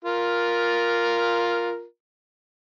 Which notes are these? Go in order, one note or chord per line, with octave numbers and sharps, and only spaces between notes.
F4 A#4